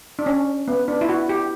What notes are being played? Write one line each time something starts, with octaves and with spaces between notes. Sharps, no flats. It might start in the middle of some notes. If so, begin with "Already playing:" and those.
D4
C#4
B3
D4
E4
F#4
G4